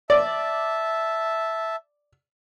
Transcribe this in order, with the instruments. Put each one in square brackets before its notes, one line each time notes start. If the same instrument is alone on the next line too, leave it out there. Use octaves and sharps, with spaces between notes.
[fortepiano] D5 [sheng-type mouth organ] E5 A5